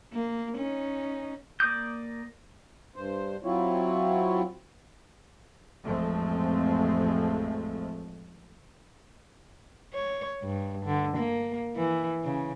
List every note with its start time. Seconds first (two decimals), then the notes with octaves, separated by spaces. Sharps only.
0.13 A#3
0.57 C#4 D#4
1.60 A#3 D5 D6 D#6 G6
2.96 G2 C5
3.44 F#3 C4 E4 F4 C#5
5.85 A1 F2 F3 G#3 A3 C4
9.94 C#5
10.43 G2
10.85 D3
11.17 A#3
11.76 E3
12.24 C#3